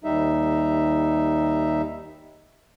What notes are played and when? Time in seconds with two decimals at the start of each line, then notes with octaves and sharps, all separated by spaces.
0.04 D#2 G3 D#4 E5